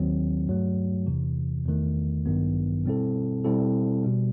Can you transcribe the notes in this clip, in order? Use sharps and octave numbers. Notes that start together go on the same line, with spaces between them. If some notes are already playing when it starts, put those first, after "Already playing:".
Already playing: D#2 D#3 F#3 C4
G2 F#3 A3
E2 C3 E3
E2 D#3 A3
A1 G2 D#3 F#3 B3
B2 G3 C4 E4 A4
B2 G3 C4 E4 A4
B2 G3